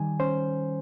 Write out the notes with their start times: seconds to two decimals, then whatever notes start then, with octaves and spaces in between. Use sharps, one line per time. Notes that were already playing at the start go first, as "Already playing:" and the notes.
Already playing: D#3 G3 G#5
0.20 C#4 C5